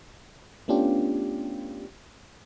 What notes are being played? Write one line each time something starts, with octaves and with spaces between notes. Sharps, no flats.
A3 B3 C#4 D4 F4 G4